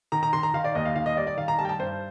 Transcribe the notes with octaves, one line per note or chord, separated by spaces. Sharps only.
D#3 A#5
A#5
D#3 C6
A#5
D#3 F5
D5
D#2 D#5
F5
D#3 F5
D#5
G3 D5
D5
D#3 F5
A#5
G3 A5
G5
A5
G2 C5